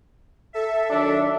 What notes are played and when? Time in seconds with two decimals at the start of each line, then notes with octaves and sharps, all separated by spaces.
0.53 A4 E5
0.90 D#3 F#3 D4